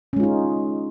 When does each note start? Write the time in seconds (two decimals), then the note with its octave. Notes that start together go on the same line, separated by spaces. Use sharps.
0.13 C#4
0.16 G#3
0.20 F4
0.23 D#4